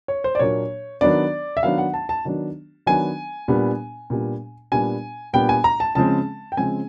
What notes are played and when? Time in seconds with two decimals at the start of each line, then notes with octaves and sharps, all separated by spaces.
0.08 C#5
0.24 C5
0.35 D5
0.40 A#2 F#3 A#3 D4 C#5
1.01 D#3 F#3 B3 D4 D5
1.57 E5
1.63 D#3 F#3 B3 D4 F5
1.78 F#5
1.94 A5
2.09 A5
2.25 D#3 F#3 B3 D4
2.86 D#3 F#3 B3 D4 G#5
3.48 A#2 G3 B3 D4
4.10 A#2 G3 B3 D4
4.72 A#2 G3 B3 D4 G#5
5.33 A#2 G3 B3 D4 G5
5.49 G#5
5.64 A#5
5.80 A5
5.95 C#3 F3 G#3 C4 A5
6.52 G5
6.57 C#3 F3 G#3 C4 G#5